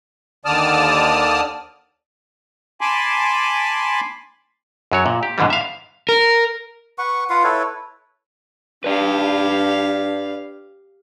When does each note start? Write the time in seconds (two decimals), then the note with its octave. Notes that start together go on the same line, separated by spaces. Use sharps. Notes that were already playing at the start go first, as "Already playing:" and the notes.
0.45 D#2 D3 D5 A5 D#6 F6
2.81 G#5 A5 B5 C6 D6
4.92 F#2 F#3 C#5
5.06 A#2
5.23 G4
5.38 G#2 B2 D3 E3 G3
5.50 E5 F5
6.09 A#4
6.98 B4 F#5 C#6
7.30 F4 B4 F5 F#5
7.44 E4 A4 B4 C#5
8.84 D4 G4 B4 D5 F5